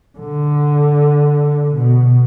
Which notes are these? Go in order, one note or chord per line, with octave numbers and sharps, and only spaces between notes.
D3
B2